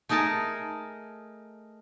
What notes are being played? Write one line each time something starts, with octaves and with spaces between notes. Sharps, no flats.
A3 D#4 G#4 A#4 A5